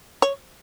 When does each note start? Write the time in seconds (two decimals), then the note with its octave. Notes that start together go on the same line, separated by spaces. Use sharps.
0.22 C#5